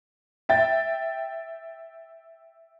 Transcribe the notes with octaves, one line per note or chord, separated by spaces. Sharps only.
E5 G5 A6